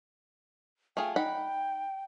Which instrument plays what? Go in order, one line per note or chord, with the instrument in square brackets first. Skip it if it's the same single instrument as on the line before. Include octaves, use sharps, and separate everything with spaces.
[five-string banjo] A3 F4 G#4 [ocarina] G5
[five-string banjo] D#4 F#5 B5 [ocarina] G5